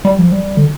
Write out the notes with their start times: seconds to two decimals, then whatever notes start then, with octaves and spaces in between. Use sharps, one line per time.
0.05 G3
0.18 F3
0.32 G3
0.57 D3